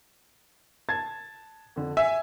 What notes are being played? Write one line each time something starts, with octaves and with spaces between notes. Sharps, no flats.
A5 G#6 A6
F2 D3
E5 G#5